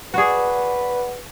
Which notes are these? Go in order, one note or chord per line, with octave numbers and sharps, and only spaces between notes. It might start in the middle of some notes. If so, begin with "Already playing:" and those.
F#4 G#4 B4 D5 F#5